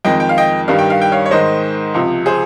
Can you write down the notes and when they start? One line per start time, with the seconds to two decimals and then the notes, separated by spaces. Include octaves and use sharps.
0.05 F2 D#3 G#3 D#5 G5
0.20 G5
0.29 F5
0.38 D#5 G5
0.68 G2 D#3 G3 F5
0.79 G5
0.90 F5
1.02 G5
1.12 C#5 F5
1.26 C#5
1.31 G#2 D#3 G#3 C5 D#5
1.94 C#2 C3 F3
2.26 G#4 C5